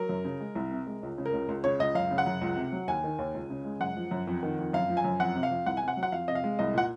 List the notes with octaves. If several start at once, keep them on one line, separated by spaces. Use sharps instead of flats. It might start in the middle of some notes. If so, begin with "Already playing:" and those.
Already playing: F#3 A#4
F#2
C#3
G#3
C2
C3
G#3
C#2
C#3
A#4
C#2
C#2
C#3 C#5
C#2 D#5
F#2 F5
C#3
F#5
F#2
C#2
C3
F#3
D#2 G#5
D#3
D#2
C#2
C#3
G#3
F#2 F#5
F3
F#2
F2
D#3
F2
F#2 F5
F3
G#5
F#2
F2 F#5
C3
F5
F2
C2 F#5
G#5
C3
F#5
F#3
F#5
F2 F5
C3 D#5
F5
G#3
C2 D#5
A#2 F#5